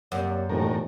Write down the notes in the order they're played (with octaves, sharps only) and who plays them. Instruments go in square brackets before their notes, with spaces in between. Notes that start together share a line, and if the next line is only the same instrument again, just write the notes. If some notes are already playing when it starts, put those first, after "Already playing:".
[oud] F#2 [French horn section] C3 A#3 D5
[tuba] E1 [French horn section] D#2 G3 [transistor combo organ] A2 A#4